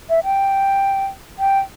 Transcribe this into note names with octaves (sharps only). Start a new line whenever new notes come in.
E5
G5
G5